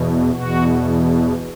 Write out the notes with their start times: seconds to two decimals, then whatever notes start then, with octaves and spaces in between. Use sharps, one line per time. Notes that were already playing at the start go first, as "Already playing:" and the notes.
Already playing: E2 B2
0.34 E2 B2 F#4